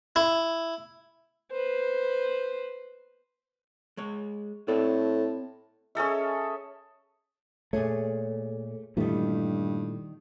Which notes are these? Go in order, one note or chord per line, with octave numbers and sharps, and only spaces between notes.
E4
B4 C5
G#3 C#5
A2 C4 A4 D5
C#4 G#4 A4 E5
A#2 A3 G#4 C#5
G2 A#2 D#3 E3 G3 A3